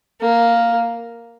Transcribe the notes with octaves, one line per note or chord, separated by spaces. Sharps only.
A#3